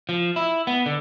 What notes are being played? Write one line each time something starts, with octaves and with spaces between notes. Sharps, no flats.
F3
E4
B3
D3